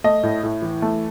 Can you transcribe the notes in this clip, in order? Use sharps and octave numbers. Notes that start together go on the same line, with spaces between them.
A3 D#5
A2
A2
E3
A3